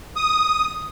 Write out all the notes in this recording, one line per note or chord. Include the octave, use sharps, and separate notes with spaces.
D#6